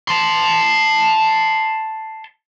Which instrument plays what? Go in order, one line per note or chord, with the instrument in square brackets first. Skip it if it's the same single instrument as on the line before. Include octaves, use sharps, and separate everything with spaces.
[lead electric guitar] A5 C6